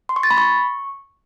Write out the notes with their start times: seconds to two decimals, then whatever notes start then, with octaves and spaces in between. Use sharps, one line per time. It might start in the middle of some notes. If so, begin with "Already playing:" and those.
0.09 C6
0.16 C#6
0.23 A6
0.30 B5
0.38 C#6